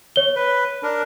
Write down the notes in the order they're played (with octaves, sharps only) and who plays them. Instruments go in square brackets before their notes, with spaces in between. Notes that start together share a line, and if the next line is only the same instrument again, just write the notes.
[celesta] C#5 G7
[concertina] B4
D4 A#4